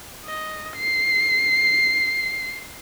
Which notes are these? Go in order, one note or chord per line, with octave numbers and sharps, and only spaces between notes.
D#5
C7